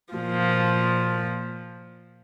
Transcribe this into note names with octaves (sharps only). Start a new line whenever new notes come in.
A#2 F3